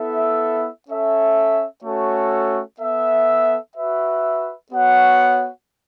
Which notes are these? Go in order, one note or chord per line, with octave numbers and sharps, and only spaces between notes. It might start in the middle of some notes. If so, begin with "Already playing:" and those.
Already playing: B3 E4 A4 E5
C#4 A4 E5
A3 C#4 F#4 A4 C#5
B3 A4 E5
F#4 B4 E5
B3 F#4 C#5 F#5